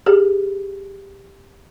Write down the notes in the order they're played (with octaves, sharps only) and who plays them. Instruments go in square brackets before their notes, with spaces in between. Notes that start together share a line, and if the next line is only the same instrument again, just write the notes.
[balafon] G4 G#4